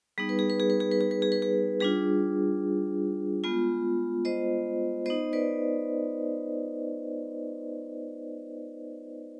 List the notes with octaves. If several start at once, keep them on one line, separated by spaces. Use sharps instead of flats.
G3 B3 D#4 G#4
B4
G#4
B4
G#4
B4
G#4
B4
G#4
B4
G#4
B4
G#4
G3 D4 F4 G#4
G#3 B3 F4
C5 D#5
B3 D#4 C5 D#5
B4 D5